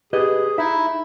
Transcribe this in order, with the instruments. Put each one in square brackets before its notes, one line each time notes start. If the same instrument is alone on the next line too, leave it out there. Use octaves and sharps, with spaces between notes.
[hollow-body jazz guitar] G4 B4 D#5 [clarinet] G#4
[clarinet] D#4 [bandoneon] E4 [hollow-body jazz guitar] E5